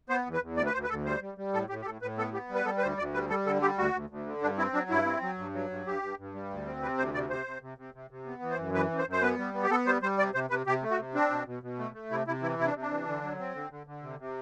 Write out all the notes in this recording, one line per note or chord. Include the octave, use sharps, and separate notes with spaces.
B3 C5
E2
B4
E2
D2 D5
B4
D2 C5
B4
D2 A4
G3 C5
G3
G3
A2 A4
A2 G4
G4
A2 A4
A2 B4
B3 A4
B3 G4
G3
B4
G3 A4
B4
D2 C5
D2 D5
G3 B4
G3 A4
D3 A4
G3 G4
D2 F#4
D2
D2
D3
G2 D4
C4 E4
F#3 D4
G2 E4
C4
F#3
G2
F#3
G2
G2 G4
G2
G2
G3
D2
C4
C3 B4
D2 C5
C3 D5
C3 C5
C3
C3
C3
C3
C3
B3
E3
C5
F#2
E3 B4
F#2
C5
F#2
C5
B3 B4
G3
B3
G4
B3 A4
G3 C5
G3 C5
C3 D5
C3 C5
C3 B4
C3 G4
A3
F#4
C3
C4 D4
B2
B2
B2
A3
A3
C3 E4
C3 E4
E3 E4
C3 E4
D4
C3
D4
E3
D3
F#3
C4
D3
D3
D3
C3
C3